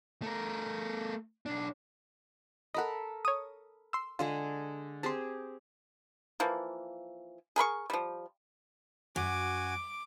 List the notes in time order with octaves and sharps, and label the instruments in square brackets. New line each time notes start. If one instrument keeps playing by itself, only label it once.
[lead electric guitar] A3 A#4
B1 D4
[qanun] A4 A#4 B5 [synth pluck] D#5 F#5
[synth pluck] C#5 D#6
C6 E6
[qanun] D3 G#3 G#4 [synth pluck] F4
[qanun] C4 G4 G#4 [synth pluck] A5 C6
[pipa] E3 F3 A#3
G#4 A#4 B5 C#6
F3 G3
[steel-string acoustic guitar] F#2 [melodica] F#4 G#5 [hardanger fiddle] D6